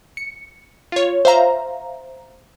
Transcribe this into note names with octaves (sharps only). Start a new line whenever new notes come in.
C#7
F4 C#5
C5 E5 F5 A#5